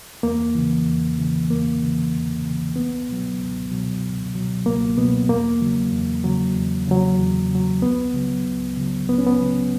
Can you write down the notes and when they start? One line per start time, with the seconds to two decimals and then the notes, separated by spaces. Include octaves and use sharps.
0.23 E2 A#3
0.55 C#3 E3
0.86 E2
1.18 C#3 E3
1.49 E2 A#3
1.82 C#3 E3
2.13 E2
2.44 C#3 E3
2.76 C#2 B3
3.09 B2 F#3
3.39 C#2
3.71 B2 F#3
4.03 C#2
4.35 B2 F#3
4.66 C#2 A#3
4.97 B2 F#3 B3
5.29 E2 A#3
5.61 C#3 F#3
5.92 E2
6.24 C#3 F#3
6.56 E2
6.87 C#3 F#3
7.19 E2
7.50 C#3 F#3
7.82 C#2 B3
8.14 C#3 F#3
8.45 C#2
8.77 C#3 F#3
9.08 C#2 B3
9.18 C#4
9.27 B3
9.41 C#3 F#3